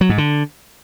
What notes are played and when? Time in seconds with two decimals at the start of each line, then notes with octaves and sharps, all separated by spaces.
0.01 F#3
0.09 G#2
0.18 D3